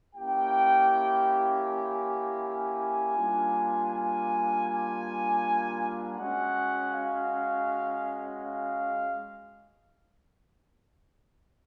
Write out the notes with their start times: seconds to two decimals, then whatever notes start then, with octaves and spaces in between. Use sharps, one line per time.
0.15 A#3 C#4 E4 G4 G5
1.66 G#5
2.41 G#5
3.16 G3 A#3 D4 F4
3.91 G#5
4.66 G#5
6.17 G#3 C#4 F#4 F#5
6.92 F5
8.43 F5